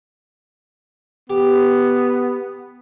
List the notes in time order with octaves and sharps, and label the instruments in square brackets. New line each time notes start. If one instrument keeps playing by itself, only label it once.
[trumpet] B3 [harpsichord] G4